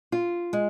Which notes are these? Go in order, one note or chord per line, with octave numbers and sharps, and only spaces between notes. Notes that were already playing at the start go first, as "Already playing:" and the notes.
F4
G#3